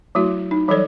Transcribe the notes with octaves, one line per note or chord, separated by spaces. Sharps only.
F#3 A3 E4 F#4
D#4
E3 F#3 G3 A4 C#5 D5